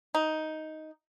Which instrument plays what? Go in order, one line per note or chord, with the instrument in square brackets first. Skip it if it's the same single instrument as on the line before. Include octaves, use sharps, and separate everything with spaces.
[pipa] D#4